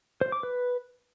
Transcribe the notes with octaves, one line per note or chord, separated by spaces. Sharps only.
C5
D6
B4